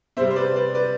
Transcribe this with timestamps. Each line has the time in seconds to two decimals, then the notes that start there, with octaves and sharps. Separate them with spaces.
0.17 C3 G3 C4 C5 E5
0.30 C5
0.36 B4 D5
0.55 B4 D5
0.75 B4 D5